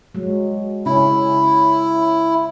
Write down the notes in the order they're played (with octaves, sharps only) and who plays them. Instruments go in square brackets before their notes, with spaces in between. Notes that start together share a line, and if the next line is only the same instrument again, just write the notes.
[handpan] F#3 G#3
[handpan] C#3 C#4 [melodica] E4